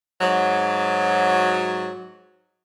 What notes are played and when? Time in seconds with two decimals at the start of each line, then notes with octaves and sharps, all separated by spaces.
0.20 G#2 F#3